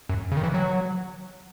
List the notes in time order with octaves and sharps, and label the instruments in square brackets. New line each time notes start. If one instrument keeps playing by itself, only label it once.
[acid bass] F#2
C#3
D#3
E3
F#3